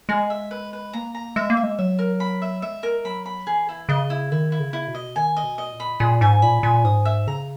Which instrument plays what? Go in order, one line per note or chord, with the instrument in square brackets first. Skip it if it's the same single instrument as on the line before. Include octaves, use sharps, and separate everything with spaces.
[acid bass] G#3 [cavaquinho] G#4
[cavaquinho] E5
B4
B4
[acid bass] A#3 [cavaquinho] A#5
[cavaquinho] A#5
[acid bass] G#3 [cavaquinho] E5
[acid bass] A#3
[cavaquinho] E5
[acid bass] G#3
[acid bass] F#3 [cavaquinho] E5
[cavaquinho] A#4
B5
E5
[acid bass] G#3 [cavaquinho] E5
[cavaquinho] A#4
[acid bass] F#3 [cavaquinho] B5
[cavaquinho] B5
[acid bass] E3 [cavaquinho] G#4
[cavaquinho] E4
[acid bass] C#3 [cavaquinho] D#5
[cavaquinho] E4
[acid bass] D#3 [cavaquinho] E4
[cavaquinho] E4
[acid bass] C#3
[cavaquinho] E4
[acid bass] B2
[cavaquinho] D#5
[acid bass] D#3 [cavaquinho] G#5
[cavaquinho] D#5
[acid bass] B2
[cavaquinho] D#5
[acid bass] A#2
[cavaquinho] B5
[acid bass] A#2 [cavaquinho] G#4
[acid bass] G#2 [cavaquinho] G#5
[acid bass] A#2 [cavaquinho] B5
[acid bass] A#2 [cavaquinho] G#5
[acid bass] G#2 [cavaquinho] D#6
[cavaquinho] E5
[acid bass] C#3 [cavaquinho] A#5